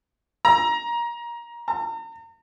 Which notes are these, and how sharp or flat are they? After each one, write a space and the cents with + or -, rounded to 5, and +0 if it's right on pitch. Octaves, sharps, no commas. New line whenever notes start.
A#5 +20
A#5 -40